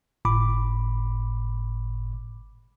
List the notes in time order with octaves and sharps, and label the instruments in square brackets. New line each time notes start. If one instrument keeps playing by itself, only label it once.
[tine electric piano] G1 A2 B5 D6